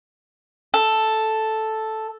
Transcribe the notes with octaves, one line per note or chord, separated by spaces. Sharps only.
A4